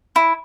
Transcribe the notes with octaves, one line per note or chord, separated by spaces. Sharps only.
E4